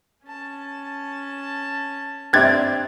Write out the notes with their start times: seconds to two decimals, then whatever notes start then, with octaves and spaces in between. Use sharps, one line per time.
0.25 C#4 A5
2.33 G2 C4 G4 D5 E5 F#6 G#6 A6